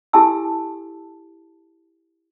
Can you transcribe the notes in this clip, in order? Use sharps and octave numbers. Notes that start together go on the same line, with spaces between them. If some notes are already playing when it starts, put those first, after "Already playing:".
E4 G4 A4 G#5 A5 E6